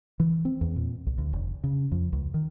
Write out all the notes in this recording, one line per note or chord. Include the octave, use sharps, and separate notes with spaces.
E3
C4
E2
A#2
C2
D2
F1
C#3
F2
C#2
D#3